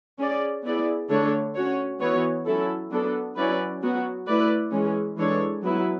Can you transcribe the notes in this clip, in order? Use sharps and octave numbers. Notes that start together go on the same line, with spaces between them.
C#4 G#4 D5
B3 E4 G#4 D5
D3 A3 D4 A4 C#5
C#4 F#4 C#5
E3 B3 F#4 C#5
F#3 C#4 E4 A4
F#3 B3 D4 A4
F#3 C#4 E4 B4 D5
F#3 B3 F#4
A3 E4 B4 D5
E3 G#3 C#4
E3 G#3 D4 A4 C#5
F#3 B3 E4 B4